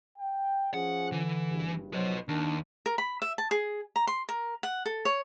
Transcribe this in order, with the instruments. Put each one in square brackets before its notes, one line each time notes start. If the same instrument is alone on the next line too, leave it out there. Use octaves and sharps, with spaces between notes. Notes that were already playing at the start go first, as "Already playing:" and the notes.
[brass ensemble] G5
[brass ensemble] F3 C#4 [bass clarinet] G#4 [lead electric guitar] F#5
[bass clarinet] D3 [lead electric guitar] E3
[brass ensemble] F#1 G2
[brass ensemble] B1 F3 C5 [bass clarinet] F#3 [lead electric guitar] B4 D#5
[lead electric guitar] D#2 [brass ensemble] D#3 [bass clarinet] D4
[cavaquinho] A#4
B5
E5
A5
G#4
A#5
C6
A#4
F#5
A4
C#5